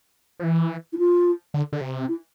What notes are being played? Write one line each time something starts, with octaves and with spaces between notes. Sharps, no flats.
F3
E3
E4
F4
D3
D3
C3
E4